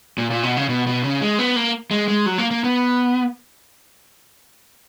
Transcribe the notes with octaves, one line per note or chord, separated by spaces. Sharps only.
A#2
A#2
B2
C#3
B2
B2
C#3
G#3
B3
A#3
G#3
G#3
F#3
A#3
A#3
B3